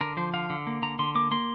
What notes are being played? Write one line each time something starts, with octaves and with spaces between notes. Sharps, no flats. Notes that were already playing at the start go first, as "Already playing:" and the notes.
D3 A#4
F3 C5
D3 F5
D3
A#3
D3 A#5
D3 C6
A#3 D6
A#3 C6